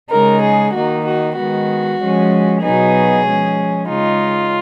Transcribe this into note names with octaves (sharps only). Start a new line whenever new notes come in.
C#3 G#3 D#4 A#4
G#4
D#3 A#3 D#4 F#4
F#4
D#3 G#3 B3 F#4
F3 G#3 C#4
B2 F#3 B3 D#4 G#4
F3 G#3 C#4
C#3 G#3 D#4 F4